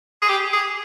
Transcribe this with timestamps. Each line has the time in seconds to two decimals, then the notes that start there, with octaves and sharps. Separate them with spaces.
0.22 G#4
0.28 G4
0.53 G#4